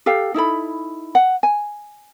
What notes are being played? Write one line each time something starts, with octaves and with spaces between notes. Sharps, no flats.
G4 A4 F5 G5
D#4 E4 A4 B5
F#5
G#5